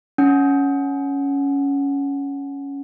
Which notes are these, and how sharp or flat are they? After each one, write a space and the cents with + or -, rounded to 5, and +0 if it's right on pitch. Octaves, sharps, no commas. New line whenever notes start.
C#4 +10 F#5 +0